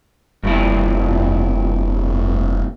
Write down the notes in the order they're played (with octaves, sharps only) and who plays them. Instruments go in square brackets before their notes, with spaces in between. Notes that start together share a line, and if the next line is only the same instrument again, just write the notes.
[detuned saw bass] F1 [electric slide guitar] G2 A#2 E4